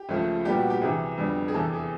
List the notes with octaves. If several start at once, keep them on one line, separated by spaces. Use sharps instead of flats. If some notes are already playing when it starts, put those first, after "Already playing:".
Already playing: G4
C#2 C#3 F3 A3
A#2 G3 B3 G4
F#4
G4
C2 C3 E3 G#4
F2 D3 G3 B3
G#4
E2 C3 E3 A4
G#4